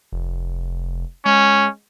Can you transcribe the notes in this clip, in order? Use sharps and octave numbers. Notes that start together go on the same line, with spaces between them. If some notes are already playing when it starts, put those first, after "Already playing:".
F1
G#3 C#4